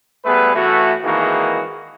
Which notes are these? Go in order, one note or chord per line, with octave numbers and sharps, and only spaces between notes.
G3 A3 B3 G#4 B4
A2 E3 A3 F#4
G#1 D#3 E3 A#3 F#4 G#4